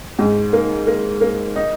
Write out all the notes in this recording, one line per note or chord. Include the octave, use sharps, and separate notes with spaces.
G#2
A#3
A#3
A#3
D#4